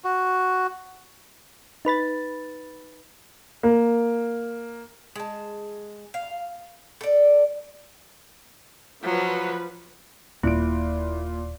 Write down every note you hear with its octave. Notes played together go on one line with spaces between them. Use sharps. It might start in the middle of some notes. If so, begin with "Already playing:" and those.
F#4
D#4 B4 B5 A6
A#3
G#3 A5
F5
A4 D5
F3 F#3 B4
D#1 A#2 E4 D7